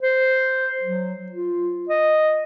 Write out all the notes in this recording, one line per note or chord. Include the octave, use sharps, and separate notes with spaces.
C5
F#3
F4
D#5